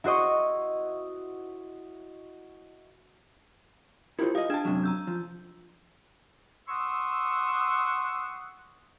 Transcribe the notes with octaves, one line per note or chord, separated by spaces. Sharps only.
E4 F#4 C5 D#5 C#6
E4 F4 G4 A#4 C5
G4 D#5 F5 D#6
D4 G#4 G5 A5 G#6 E7
F#2 C3 F#3
A#5 E6 G6
F3
F#5 C6 C#6 D#6 E6